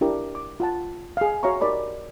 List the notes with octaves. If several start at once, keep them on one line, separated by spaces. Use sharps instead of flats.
D4 E4 G4 A#4 D5
D6
F4 F#5 A5
G#4 F5
F#4 C#5 E5 F5 A#5 C#6
D#4 G4 A#4 D5 B5 D6